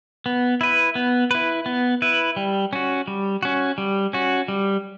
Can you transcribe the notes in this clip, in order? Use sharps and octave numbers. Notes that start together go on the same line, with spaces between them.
B3
E4 B4
B3
E4 B4
B3
E4 B4
G3
C#4 F#4
G3
C#4 F#4
G3
C#4 F#4
G3